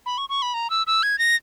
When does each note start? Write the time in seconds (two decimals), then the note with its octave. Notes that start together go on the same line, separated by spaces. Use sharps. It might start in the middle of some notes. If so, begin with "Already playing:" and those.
0.06 B5
0.18 C#6
0.29 C#6
0.42 B5
0.54 A#5
0.70 E6
0.87 E6
1.03 G#6
1.19 A#6